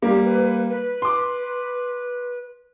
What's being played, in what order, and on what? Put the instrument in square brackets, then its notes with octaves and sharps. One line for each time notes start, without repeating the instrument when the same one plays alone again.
[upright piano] G3 A#3 [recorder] G4
[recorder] B4
B4
[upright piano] C6 D6